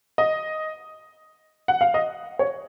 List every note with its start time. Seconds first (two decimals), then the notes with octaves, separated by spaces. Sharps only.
0.18 D#5
1.68 F#5
1.81 F5
1.94 D#5
2.39 C#5